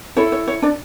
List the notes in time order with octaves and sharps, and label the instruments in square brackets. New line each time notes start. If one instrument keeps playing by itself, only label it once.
[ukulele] E4 A4 C#5
C#5
C#5
D4 D5